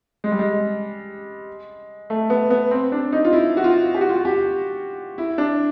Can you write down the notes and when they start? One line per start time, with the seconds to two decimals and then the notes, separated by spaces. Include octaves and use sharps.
0.24 G#3
0.32 G3
0.39 G#3
2.10 A3
2.30 B3
2.50 B3
2.71 C4
2.92 D4
3.12 D#4
3.25 F4
3.33 E4
3.57 F#4
3.64 F4
3.95 G4
4.01 F#4
4.09 F4
4.15 F#4
4.25 G4
5.18 E4
5.38 D4